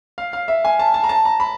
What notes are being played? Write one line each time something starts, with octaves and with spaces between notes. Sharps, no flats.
F5
F5
E5
G#5
A5
A5
A#5
A5
A#5
B5